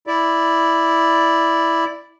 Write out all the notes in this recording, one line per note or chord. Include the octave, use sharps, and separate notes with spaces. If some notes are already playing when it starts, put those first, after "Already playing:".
E4 D5